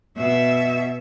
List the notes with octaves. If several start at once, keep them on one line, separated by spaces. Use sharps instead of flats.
B2 E5